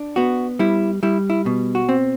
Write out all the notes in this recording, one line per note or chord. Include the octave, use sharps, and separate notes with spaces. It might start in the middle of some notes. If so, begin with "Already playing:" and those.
Already playing: D4
B3 F#4
G3 E4
G3 E4
E4
B2
F#4
C4